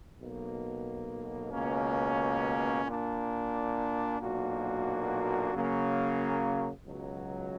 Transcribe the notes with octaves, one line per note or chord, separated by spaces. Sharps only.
B1 B2 A#3
C#2 B2 A#3 C#4
A#2 A#3 D4
B1 A#2 A#3 D4 F#4
C#3 F#3 A#3 C#4
C#2 B2 F#3